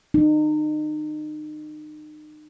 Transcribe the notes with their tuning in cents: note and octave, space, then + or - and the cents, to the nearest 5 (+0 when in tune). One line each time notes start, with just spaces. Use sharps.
D#4 -35